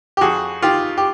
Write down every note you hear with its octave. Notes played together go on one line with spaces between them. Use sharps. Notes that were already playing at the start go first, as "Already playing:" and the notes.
G4
F2 F#4 G#4
D#3 F4 G4
G4